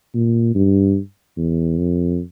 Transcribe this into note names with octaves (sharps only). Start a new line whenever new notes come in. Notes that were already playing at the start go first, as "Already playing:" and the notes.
A#2
G2
E2
F2